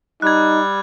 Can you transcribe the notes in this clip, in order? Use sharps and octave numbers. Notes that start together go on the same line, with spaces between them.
G3 D#4 F#6 G#6